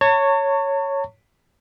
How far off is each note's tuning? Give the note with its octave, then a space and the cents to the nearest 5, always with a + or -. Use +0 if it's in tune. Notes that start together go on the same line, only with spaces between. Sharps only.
C#5 +0 A5 +45 C#6 +5